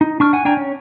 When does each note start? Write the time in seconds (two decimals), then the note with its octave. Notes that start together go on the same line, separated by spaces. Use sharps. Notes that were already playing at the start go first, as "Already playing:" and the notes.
0.01 D#4
0.20 D4 C#6 F6
0.33 F#5 G#5
0.45 D4 G5 G#5 A#5
0.57 C#4